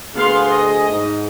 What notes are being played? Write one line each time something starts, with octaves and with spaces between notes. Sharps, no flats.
D2 B3 G#4 F5 C6
D#5
G#2